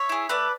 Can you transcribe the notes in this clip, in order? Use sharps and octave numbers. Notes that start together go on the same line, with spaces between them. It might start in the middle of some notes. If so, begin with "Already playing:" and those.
Already playing: C#5 E5
E4 G#4
A3 B4 D5